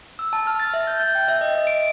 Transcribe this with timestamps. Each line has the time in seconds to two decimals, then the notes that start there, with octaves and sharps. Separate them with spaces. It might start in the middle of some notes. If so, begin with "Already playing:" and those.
0.19 E6
0.33 A5
0.47 F6
0.60 A6
0.74 E5
0.87 G6
1.00 G6
1.15 G5
1.28 E5
1.41 D#5
1.55 D#5
1.67 D7